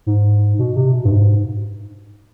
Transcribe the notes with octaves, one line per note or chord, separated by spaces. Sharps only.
G#2
B2
C3
B2
G2
G#2